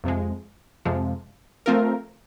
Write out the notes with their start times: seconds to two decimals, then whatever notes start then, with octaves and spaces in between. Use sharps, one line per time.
0.04 F2 C3 F3 G#3
0.85 F2 C3 F3 G#3
1.66 F3 A3 C4 F4 A#4